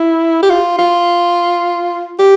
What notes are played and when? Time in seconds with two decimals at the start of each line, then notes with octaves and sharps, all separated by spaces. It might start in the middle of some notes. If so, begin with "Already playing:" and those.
Already playing: E4
0.42 G4
0.50 F4
0.78 F4
2.19 G4